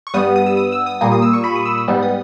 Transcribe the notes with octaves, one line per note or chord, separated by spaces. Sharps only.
C#6
G2 G3 B3 D#6
D#6
E6
D#6
E6
D#6
A#2 G3 A#3 D#6
D#6
E6
C#6
B5
D#6
E6
E6
G#2 G3 B3
D#6